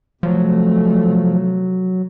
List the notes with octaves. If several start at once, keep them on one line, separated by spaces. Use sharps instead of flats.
C3 F3 F#3 A3